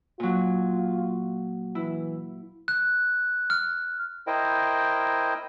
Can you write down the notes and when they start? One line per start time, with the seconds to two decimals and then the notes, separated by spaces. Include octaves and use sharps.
0.20 A#2 F#3 F4
1.75 E3 E4
2.68 F#6
3.50 F6
4.27 E4 A#4 C5 D#5 G5